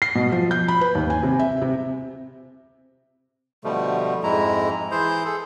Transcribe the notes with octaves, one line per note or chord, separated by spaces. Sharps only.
C7
B2
F3
G6
B5
B4
D#2
G#5
C3
E5
C3
B2 D3 F3 G3 A3
F2 G#2 G#3 E4 A#5
E3 E4 G#4 C5 C6 G6
G#4 A4